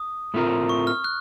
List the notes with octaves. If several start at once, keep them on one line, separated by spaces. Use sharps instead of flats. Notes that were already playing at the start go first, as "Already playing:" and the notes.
Already playing: D#6
A2 A3 C4 F4 A#4
C#6
F6
F#6